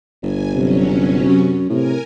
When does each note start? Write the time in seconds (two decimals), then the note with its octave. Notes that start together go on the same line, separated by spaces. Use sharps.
0.23 G1 G#5
0.54 C3 F#3 C#4
0.88 C3
1.29 F#2
1.69 A2 C3 A#4 G#5